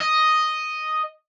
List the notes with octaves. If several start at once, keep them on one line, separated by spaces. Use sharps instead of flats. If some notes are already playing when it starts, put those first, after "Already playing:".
D#5